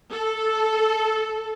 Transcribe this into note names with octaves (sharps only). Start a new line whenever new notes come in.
A4